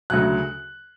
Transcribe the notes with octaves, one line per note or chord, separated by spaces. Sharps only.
D2 C#3 F#3 F#6